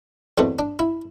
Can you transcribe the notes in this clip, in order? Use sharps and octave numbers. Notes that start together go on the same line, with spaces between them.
E2 B2 A3 C4
D4
E4